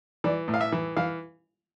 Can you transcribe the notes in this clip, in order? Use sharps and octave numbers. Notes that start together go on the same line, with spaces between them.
E3 D5
A2
F5
E5
E3
E3 F5